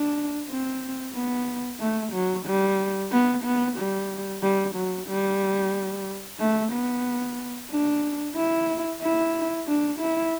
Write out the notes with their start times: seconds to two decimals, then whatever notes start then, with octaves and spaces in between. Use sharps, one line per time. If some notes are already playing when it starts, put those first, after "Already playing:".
Already playing: D4
0.48 C4
1.13 B3
1.80 A3
2.13 F#3
2.46 G3
3.11 B3
3.44 B3
3.77 G3
4.42 G3
4.75 F#3
5.07 G3
6.39 A3
6.72 B3
7.71 D4
8.36 E4
9.02 E4
9.67 D4
10.00 E4